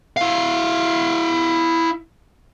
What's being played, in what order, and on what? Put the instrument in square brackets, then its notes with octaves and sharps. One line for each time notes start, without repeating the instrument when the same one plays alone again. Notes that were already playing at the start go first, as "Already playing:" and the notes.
[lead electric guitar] E4 F5